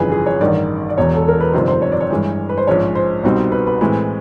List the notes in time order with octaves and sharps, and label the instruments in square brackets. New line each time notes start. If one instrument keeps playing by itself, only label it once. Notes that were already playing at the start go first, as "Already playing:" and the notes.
Already playing: [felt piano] G1 F2 C#3 E3 [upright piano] G#4 B4
[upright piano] G#4
C#5
[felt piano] A1 G2 D#3 [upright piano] D5
[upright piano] D5
[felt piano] E1 E2 B2 [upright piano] C#5
[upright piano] A4
A#4
B4
[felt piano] G1 F2 C3 D#3 [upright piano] C5
[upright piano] C5
C#5
D5
C#5
[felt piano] G2 E3 G#3
[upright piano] B4
C5
[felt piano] A#1 G#2 F3 G#3 C#4 [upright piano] C#5
[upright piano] C5
[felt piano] C2 B2 G3 C4 D#4
[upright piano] B4
B4
[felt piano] A2 E3 G#3 C4 [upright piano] B4